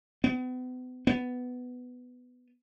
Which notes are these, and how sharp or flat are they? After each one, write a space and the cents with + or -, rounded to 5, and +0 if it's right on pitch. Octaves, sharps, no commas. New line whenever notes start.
B3 +40
B3 +10